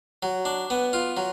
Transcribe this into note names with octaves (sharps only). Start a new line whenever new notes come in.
F#3
D4
B3
F4
F#3